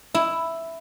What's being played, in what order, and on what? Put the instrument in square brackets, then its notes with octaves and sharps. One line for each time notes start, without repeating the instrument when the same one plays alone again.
[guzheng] E4